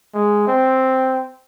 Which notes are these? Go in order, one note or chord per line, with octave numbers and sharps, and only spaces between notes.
G#3
C4